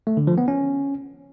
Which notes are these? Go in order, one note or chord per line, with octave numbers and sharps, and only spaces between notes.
A3
D3
F3
B3
C#4